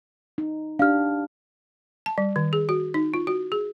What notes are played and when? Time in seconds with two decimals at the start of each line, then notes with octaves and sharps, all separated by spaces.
0.38 D#4
0.79 D4 G4 F5 F6
2.06 A5
2.18 G3
2.36 D#3
2.53 G#4
2.69 F#4
2.94 D#4
3.14 F4
3.27 F#4
3.52 G#4